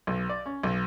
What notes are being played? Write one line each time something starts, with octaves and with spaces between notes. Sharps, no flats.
B1
D5
C#4
B1